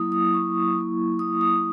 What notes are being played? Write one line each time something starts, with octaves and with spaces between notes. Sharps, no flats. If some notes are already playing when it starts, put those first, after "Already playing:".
Already playing: F#3 A#3 E4 D#6
D#6
C#6
F#3 A#3 E4
D#6
D#6